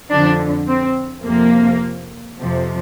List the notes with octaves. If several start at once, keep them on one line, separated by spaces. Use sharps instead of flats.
F2 D3 F3 D4
C4
F2 C3 F3 A#3
F2 C3 F3